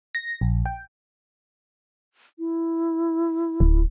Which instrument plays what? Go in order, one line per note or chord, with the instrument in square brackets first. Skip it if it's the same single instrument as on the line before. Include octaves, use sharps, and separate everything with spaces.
[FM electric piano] A#6
A#1
G5
[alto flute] E4
[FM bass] D1